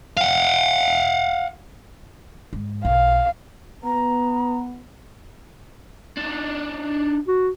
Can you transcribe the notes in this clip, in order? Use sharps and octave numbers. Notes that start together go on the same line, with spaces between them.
F5 F#5
G#2
B1 F5
B3 A#5
D4 D#4
F#4